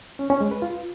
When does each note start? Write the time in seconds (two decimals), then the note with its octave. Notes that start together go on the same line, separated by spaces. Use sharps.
0.19 C#4
0.30 C#4
0.41 G#3
0.51 B4
0.62 F4